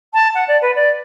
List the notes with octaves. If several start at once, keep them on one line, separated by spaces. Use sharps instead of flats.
A5
F#5
D5
B4
D5